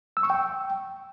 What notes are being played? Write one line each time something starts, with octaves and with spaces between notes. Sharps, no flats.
E6
C#6
G5